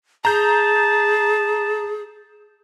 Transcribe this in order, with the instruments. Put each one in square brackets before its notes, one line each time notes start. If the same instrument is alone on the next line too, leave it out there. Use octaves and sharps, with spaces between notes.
[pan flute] G#4 [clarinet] A5 [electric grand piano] A#5 G6